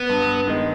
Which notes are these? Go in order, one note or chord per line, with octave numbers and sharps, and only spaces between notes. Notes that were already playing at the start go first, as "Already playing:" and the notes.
Already playing: B3
G2
D#3 G#3